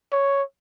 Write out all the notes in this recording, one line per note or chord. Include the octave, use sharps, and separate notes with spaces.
C#5